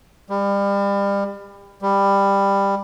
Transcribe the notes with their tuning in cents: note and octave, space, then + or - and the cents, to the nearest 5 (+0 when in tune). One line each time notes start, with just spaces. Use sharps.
G3 +30
G3 +15